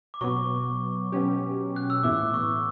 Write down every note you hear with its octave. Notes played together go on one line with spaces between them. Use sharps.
D6
B2 F#3 B3 C#6
B2 F#3 C#4 G4
F#6
E6
A2 E3 B3 E4 D6
C#6